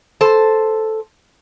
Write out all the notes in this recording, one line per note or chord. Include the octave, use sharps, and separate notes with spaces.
A4 C5